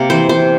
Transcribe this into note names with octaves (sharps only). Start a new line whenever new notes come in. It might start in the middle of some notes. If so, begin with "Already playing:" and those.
Already playing: C3 A#3
E3 C5
C3 C5